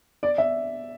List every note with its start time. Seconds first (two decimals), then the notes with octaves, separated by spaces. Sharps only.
0.23 D5
0.38 E5